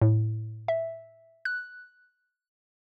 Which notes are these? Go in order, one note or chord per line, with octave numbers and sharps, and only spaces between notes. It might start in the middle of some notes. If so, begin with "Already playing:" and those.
A2
E5
F#6